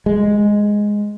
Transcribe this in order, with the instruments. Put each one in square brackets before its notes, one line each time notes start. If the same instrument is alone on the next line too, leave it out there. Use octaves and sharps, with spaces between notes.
[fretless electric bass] G#3